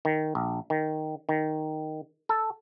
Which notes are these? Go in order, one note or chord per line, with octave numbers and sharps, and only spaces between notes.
D#3
A#1
D#3
D#3
A4